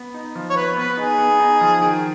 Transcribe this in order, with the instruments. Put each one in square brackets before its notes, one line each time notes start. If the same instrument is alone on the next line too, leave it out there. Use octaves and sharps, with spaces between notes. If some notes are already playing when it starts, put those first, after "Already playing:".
Already playing: [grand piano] B3
D#4
F3
[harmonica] C#5
[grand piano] B3 [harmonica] B4
[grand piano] B3 [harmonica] B4
[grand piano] D#4 [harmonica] G#4
[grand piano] B3
D#4
F3
D#3